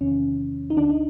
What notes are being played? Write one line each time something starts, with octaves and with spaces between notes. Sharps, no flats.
E2 C3 D#3 C#4
D#4
D2 D3 D4
D#4